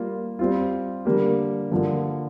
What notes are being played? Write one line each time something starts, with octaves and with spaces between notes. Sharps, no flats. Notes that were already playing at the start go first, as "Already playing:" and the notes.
Already playing: G3 A#3 F4
G3 C4 F4
D3 G3 A#3 D4 G4
G2 D3 F3 A#3 F4